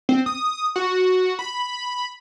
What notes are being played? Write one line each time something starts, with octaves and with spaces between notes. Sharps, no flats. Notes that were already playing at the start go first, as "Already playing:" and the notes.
C4
D#6
F#4
B5